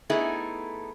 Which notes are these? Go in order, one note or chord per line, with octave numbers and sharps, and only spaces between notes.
A3 B3 D#4 E4 G#4